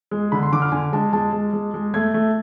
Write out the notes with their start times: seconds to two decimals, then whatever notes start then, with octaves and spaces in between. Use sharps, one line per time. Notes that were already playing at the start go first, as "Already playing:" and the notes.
0.11 G#3
0.32 D3 B5
0.43 C6
0.52 D3 D6
0.62 F6
0.72 D3 G#5
0.92 G#3 A5
1.13 G#3 A5
1.33 G#3
1.53 G#3
1.74 G#3
1.94 A3 G#6
2.14 A3